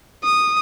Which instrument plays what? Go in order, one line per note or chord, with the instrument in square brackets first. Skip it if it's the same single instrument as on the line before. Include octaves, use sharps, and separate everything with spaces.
[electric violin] D#6